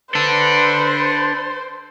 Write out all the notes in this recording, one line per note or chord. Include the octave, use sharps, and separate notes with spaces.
D4 A4 B4 C5